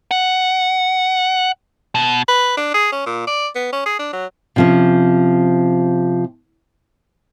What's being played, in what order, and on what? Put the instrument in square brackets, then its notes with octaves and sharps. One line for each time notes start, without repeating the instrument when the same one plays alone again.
[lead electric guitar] F#5
B2
[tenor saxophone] B4
D4
G#4
C#4
A#2
D5
B3
C#4
G#4
D4
F#3
[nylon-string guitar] C3 F3 C#4